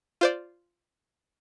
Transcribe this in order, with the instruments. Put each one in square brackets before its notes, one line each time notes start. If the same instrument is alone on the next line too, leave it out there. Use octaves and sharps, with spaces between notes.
[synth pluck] F4 C5 D5